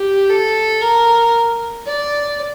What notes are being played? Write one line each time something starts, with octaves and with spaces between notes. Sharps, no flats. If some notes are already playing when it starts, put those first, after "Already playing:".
Already playing: G4
A4
A#4
D5